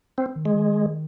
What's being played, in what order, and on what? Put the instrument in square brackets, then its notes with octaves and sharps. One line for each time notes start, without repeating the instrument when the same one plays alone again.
[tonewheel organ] C4
[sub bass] D#3
[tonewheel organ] G#3
[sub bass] D#3